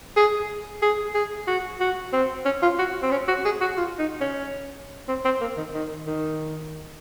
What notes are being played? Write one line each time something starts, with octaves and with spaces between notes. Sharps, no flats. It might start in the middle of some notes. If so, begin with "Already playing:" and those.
G#4
G#4
G#4
F#4
F#4
C4
C#4
F4
F#4
C4
C#4
F#4
G#4
F#4
F4
D#4
C#4
C4
C4
A#3
D#3
D#3
D#3